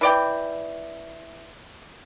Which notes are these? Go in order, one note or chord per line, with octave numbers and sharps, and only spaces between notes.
E3 D5 G5